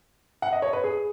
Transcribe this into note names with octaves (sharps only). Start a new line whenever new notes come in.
F#5
D#5
C#5
B4
G#4